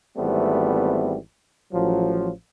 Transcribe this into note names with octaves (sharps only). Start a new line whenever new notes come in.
G#1 E3 G3 A3 B3 C4
A1 F3 F#3